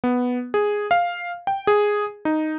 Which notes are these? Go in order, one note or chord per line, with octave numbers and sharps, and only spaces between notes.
B3
G#4
F5
G5
G#4
D#4